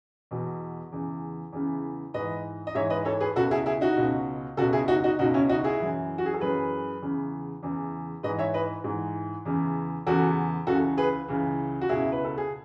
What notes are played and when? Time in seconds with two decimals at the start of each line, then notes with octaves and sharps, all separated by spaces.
0.31 E2 B2
0.92 E2 C#3 E3
1.53 E2 C#3 E3
2.14 G#2 E3 B4 D#5
2.67 D#5
2.74 G#2 E3 C#5 E5
2.90 B4 D#5
3.05 A4 C#5
3.20 G#4 B4
3.36 C#2 B2 F#4 A4
3.51 E4 G#4
3.66 E4 G#4
3.81 D#4 F#4
3.97 C#2 B2
4.57 C#2 B2 F#4 A4
4.73 E4 G#4
4.88 D#4 F#4
5.04 D#4 F#4
5.19 C#2 B2 D#4 F#4
5.34 C#4 E4
5.49 D#4 F#4
5.64 E4 G#4
5.80 F#2 E3
6.18 F#4
6.26 G#4
6.33 A4
6.40 F#2 E3 G#4 B4
7.02 E2 C#3 E3
7.63 E2 C#3 E3
8.23 G#2 B4 D#5
8.28 E3
8.38 C#5 E5
8.54 B4 D#5
8.84 G#2 E3
9.45 E2 C#3 E3
10.06 E2 C#3 E3 F#4 A4
10.67 C#2 C#3 E3 F#4 A4
10.97 G#4 B4
11.28 C#2 C#3 E3
11.81 F#4
11.89 C#2 B2 E4 G#4
12.12 B4
12.24 A4
12.38 G#4